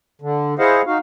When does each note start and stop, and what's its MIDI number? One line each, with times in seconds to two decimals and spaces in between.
0.22 0.54 50
0.59 0.82 64
0.59 0.82 68
0.59 0.82 72
0.59 0.82 75
0.59 0.82 77
0.59 0.82 78
0.86 0.98 63
0.86 0.98 66
0.86 0.98 77